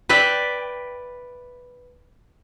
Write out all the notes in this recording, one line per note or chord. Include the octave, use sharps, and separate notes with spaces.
B4 D5 E5 G5